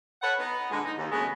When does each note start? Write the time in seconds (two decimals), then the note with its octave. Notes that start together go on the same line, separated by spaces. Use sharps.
0.22 A4 B4 C#5 F#5
0.39 B3 D#4
0.71 A#2 D3 G#3
0.85 D#4
0.97 D#2
1.12 F#2 C#3 G#3 A3 B3